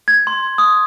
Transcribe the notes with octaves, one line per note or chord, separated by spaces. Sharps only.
G#6
C6
D#6